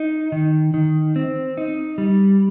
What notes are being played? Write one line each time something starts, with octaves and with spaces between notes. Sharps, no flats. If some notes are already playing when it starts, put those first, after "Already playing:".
Already playing: D#4
D#3
D#3
C4
D#4
G3